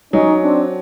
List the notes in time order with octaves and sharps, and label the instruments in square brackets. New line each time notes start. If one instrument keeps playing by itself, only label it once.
[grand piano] F#3 [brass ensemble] C#4 D#4
[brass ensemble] C4 D4